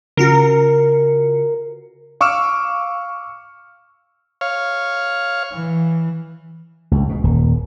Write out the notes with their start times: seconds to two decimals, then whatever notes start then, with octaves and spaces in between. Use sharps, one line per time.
0.17 C#3 F4 F#4 A#4
2.21 F5 C#6 D6 E6 F6 E7
4.41 C#5 F5
5.53 E3
6.91 C#2
7.09 B2
7.24 D#1